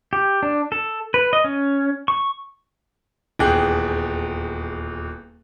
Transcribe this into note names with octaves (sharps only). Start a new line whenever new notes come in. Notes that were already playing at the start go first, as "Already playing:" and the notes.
G4
D4
A4
B4
D#5
C#4
C#6
D#1 E2 G#4 G5 F#6